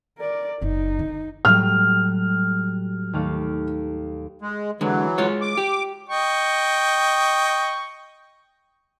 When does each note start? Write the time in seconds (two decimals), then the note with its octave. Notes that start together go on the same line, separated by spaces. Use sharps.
0.18 A#4 D5
0.62 F#1 C#3 D#4
0.99 D3
1.45 A2 F#3 G3 F6
3.13 D#2 A3 F5
4.42 G#3
4.81 D3 E3 F#3 G#3
5.18 G#3 F4 C#5
5.42 D6
5.57 G4
6.09 D#5 G5 C#6